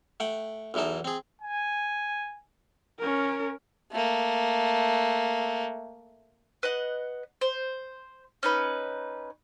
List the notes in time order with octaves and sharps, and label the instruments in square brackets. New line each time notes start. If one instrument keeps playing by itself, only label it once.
[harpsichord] A3 F#5 G5
B1 E2 E3 D#4 A4
C4 G#4
[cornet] G#5
[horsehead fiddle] C#4 A#4
[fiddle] A3 A#3
[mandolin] B4 D#5 F#5
C5
C#4 D#4 B4